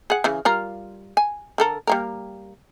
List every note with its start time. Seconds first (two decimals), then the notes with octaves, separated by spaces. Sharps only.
0.10 G#4 F#5
0.24 C#3 E3
0.45 G3 F4 A#4
1.17 G#5
1.58 D3 A4 A#4
1.87 G3 A#3 A#4